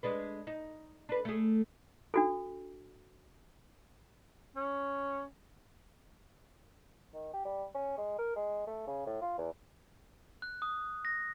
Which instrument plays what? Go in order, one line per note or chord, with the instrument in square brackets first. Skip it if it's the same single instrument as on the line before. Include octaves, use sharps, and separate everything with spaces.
[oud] G#3 D4 B4
D#4
D4 B4
A3 G#4
[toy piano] D4 F#4 A4
[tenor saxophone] C#4
[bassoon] D#3
G4
G3
C#4
G#3
A#4
G#3
A3
C#3
A2
F4
E2
[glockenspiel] F#6
D#6
A#6